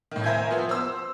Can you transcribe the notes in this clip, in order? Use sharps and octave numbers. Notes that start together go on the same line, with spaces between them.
A2 D#3
A#4 C5 E5 G#5 G6 G#6
F3 B3
C5 E6